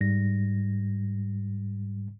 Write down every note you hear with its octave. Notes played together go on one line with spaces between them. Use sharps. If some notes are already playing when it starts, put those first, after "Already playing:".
G#2 G3 A#6